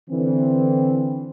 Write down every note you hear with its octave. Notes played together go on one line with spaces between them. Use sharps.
D3 E3 C4